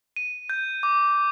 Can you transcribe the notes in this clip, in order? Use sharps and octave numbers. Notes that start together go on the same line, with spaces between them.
D#7
G6
D6